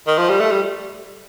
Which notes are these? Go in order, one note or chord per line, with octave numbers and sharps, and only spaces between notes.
D#3
F3
G3
A3
G3